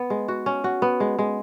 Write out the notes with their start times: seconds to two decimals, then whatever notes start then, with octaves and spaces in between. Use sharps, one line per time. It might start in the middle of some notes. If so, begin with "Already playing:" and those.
Already playing: B3
0.10 G#3
0.28 F#4
0.46 C#4
0.64 F#4
0.82 B3
1.00 G#3
1.19 G#3